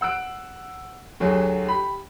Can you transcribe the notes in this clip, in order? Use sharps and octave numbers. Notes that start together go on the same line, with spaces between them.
F#5 E6 F#6 D7
D2 F#3 G4 G#4
G4 B5